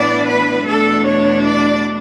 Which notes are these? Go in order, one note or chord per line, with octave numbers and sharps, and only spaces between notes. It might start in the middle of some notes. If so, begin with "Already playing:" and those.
Already playing: A2 E3 B3 D4 D5
B4
E2 B2 A3 D4 A4
C#5
D5